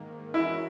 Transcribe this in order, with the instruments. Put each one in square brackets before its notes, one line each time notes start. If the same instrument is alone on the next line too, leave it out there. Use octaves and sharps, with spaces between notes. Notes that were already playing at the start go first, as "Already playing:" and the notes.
Already playing: [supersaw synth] G#2 D#3 A#3
[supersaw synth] E3 G#3 C#4 F#4 A#4 [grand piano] E4